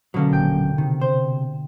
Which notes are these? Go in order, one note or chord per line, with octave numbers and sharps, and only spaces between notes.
B2 D3 F#3 A#3 C#4
E1 A#2 G5 G6
C3 D#3
C5